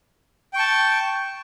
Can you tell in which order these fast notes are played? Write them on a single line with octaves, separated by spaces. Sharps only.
G5 C#6 A5